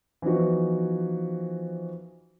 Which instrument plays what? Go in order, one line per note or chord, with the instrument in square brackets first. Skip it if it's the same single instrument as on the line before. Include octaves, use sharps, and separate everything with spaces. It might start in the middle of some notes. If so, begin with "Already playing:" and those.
[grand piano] E3 F3 B3 D#4 F#4